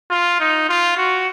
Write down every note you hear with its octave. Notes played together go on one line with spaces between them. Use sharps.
F4
D#4
F4
F#4